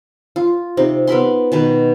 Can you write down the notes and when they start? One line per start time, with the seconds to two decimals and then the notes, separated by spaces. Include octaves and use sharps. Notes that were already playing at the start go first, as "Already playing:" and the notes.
0.36 F4
0.77 C3 D#4
1.07 B3 A#4 B5 C6
1.52 B2 D#3 B4